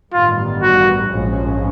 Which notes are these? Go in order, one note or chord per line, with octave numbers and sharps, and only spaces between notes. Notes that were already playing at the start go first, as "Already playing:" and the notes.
A1 G2 D#3 G3 B3 F4
F#4
A#1 G#2 F3 G#3 C#4